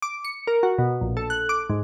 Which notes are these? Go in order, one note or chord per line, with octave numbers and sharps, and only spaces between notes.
D6
C#7
A#4
F#4
B2
A#1
A4
F#6
D6
G#2